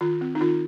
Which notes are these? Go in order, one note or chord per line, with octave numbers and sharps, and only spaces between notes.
D#3 F4
C4
D#4
D#3 F4